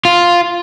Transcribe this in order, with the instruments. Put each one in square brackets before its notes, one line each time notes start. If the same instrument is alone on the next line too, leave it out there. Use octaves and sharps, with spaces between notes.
[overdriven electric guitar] F4